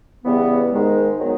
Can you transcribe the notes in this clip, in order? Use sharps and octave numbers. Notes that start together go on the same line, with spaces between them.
C#3 E3 G3 B3
G#2 D#3 G#3
D#3 F#3 B3 D#4